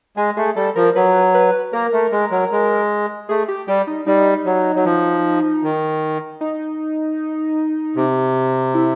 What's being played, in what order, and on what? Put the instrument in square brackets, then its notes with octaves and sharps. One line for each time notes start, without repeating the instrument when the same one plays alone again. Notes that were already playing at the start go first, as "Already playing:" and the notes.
[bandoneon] G#3 [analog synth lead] G#4
[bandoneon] A3 [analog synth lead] G#4
[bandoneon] G3 [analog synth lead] A4
[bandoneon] F3 [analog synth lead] A#4
[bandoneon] F#3 [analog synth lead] B4
[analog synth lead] B4
[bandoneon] A#3 [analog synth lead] A#4
[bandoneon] A3
G#3
F#3
G#3
[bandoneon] A3 [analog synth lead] G#4
[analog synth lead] G4
[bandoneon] G3 [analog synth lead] G4
[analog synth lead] D#4
[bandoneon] G3 [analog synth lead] D#4
[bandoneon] F#3
F#3
F3
D#3
[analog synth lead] D#4
[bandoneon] C3
[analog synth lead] E4